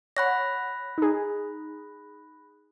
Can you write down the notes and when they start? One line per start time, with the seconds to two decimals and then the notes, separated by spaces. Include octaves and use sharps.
0.17 C#5 F#5 B5 F#6 A#6
0.98 D#4 G#4